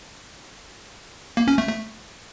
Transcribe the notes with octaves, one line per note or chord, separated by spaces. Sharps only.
A#3
C#4
A3
A3